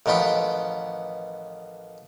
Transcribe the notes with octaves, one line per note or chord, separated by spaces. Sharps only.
A1 D#3 F3 B3 G5